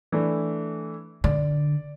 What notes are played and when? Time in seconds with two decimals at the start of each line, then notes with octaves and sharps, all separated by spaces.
0.12 E3 A3 D4
1.24 D3 D5